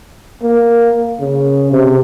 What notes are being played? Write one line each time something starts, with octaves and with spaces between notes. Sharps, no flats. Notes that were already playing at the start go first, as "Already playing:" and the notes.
A#3
C#3
C3